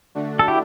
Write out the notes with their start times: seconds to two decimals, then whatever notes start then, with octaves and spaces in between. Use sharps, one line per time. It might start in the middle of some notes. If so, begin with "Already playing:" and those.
0.15 D3 A3 D4 F#4
0.39 A4
0.48 E4 G4